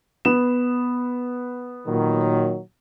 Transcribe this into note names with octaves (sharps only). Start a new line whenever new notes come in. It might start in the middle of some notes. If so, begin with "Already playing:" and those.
B3 E7
A#2 D#3 F#3